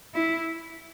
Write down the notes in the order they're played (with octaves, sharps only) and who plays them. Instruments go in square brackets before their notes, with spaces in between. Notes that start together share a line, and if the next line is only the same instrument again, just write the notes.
[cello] E4